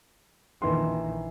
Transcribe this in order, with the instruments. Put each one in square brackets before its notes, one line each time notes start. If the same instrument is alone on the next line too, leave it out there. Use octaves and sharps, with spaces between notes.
[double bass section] A#1 F2 D#3 [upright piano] E3 C6